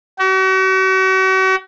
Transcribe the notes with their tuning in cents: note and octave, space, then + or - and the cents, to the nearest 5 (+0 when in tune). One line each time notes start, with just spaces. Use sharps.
F#4 +40